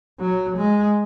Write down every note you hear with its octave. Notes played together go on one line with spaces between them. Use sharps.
F#3
G#3